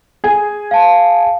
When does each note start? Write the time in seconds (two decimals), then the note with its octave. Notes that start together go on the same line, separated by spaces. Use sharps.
0.24 G#4 G#5
0.71 F5 A5